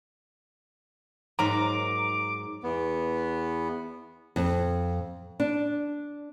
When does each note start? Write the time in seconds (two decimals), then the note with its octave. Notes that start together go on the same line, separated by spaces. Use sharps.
1.39 G#2 F#3 A#4 A#5 D6
2.63 E2 B3
4.36 F2
5.40 D4